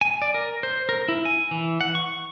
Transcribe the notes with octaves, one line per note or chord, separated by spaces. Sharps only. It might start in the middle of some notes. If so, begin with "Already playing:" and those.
G#5
D5
A#4
C5
A#4
E4
G#5
E3
F#5
C#6